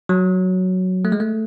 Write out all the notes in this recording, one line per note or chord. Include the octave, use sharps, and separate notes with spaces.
F#3
A3
G#3
A3